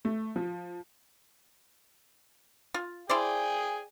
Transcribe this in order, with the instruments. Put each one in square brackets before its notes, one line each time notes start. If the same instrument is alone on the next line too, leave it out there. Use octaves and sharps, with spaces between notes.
[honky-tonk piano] A3
F3
[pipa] F4
[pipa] E4 C5 D5 [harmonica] G#4 G5 G#5